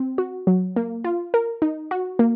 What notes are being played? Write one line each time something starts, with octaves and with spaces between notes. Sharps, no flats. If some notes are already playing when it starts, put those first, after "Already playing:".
Already playing: C4
F#4
F#3
A#3
F4
A#4
D#4
F#4
A#3